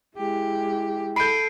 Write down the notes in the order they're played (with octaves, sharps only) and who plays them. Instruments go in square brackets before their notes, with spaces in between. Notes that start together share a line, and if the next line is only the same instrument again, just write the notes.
[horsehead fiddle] G#3 E4 [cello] G4
[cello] A4 [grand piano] B5 G6 [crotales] C7 D7 D#7